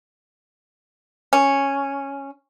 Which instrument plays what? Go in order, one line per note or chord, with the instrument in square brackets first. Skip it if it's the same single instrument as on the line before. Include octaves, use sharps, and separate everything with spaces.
[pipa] C#4